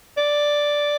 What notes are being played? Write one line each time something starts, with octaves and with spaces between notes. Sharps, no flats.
D5